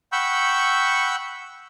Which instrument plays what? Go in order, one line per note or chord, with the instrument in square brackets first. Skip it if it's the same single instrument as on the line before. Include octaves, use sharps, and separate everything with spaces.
[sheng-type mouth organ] F#5 G5 B5 C#6 E6 G6